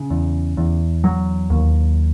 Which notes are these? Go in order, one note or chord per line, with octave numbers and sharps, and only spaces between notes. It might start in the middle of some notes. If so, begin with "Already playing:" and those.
Already playing: C#3
E2
E2
F#3
D#2